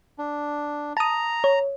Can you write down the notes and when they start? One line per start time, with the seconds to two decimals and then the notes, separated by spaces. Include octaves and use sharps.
0.18 D4
0.97 A5 A#5 D#6
1.44 C#5